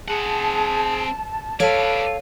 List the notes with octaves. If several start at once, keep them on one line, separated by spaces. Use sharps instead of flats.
C4 G#4 F#5 A5
A4 B4 C#5 D5 F5